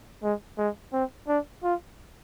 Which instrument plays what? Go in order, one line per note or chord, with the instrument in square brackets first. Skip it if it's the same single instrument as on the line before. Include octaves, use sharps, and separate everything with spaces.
[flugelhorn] G#3
G#3
C4
D4
F4